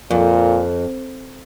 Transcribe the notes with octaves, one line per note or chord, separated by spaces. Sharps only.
F2 A#2